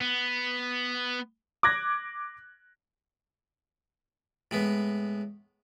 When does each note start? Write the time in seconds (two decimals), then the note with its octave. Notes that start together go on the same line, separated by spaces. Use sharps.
0.01 B3
1.63 D6 F#6 G#6 A#6
4.51 A2 G#3 B3